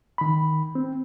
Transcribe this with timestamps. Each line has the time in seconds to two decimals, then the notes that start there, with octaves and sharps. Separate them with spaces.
0.18 D#3 B5
0.75 C4